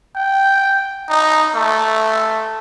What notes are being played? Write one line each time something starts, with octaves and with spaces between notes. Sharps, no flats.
G5
D#4
A3